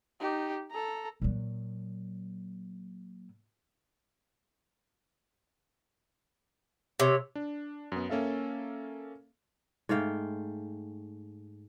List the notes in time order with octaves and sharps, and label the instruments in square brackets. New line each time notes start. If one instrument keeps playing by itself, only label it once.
[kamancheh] D#4 G4
A4 A#5
[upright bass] A#2 F#3
[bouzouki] C3 [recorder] C#5
[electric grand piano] D4
F#2 B3
A#3 C#4 A4 E5 F5
[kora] G#2 A3 F5 G5